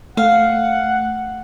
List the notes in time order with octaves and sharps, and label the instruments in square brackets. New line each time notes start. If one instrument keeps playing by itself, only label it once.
[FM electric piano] A3 [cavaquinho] F5 [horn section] F#5